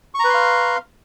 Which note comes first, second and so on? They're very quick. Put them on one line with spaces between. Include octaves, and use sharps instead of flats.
C#6 A#5 B4 C6 F5